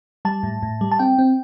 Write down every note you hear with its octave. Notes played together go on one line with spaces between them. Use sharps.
G3 A5
A2
A2
G3
A5
C4 G5
C4